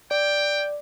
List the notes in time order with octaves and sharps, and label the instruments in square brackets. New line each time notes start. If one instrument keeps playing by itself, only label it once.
[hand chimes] D5 [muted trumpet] G5